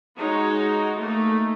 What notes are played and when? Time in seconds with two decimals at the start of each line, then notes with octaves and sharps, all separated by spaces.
0.17 G#3 D#4 F#4 C#5
0.98 A3 A#3 D#4